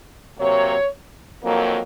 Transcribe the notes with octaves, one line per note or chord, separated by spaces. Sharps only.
C3 F#3 A#3 C#5
F2 D#3 F#3 A#3